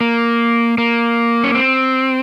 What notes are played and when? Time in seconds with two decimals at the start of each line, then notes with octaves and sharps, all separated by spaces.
0.01 A#3
0.78 A#3
1.44 C#4
1.54 C4